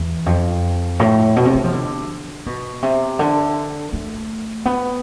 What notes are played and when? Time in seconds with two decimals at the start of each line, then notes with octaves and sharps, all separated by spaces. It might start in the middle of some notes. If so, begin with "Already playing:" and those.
Already playing: E2
0.26 F2
0.99 A2
1.36 B2
1.45 C3
1.55 G#3
1.64 F3
1.73 D3
2.46 B2
2.83 C3
3.19 D3
3.93 A3
4.65 B3